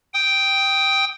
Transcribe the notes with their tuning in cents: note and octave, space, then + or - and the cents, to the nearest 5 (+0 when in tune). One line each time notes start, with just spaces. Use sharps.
G5 +0 D#6 +15